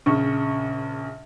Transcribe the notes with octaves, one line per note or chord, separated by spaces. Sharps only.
A#1 C#3 C#6